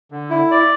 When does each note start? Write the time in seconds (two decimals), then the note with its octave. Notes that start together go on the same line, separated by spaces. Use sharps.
0.12 D3
0.30 E4
0.51 D5